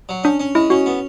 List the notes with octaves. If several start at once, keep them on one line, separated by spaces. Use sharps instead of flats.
F#3
C#4 D4
C#4
G#3 E4
C#4 F#4
B3